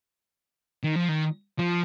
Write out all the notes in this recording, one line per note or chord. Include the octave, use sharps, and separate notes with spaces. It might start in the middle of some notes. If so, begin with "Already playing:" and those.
D#3
F3
D#3
F3